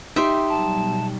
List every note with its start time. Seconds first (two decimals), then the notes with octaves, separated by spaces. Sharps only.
0.16 D#4 G4 E5 C6
0.49 B2 F#3 G3 A5